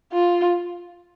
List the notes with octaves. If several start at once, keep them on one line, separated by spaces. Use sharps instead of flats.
F4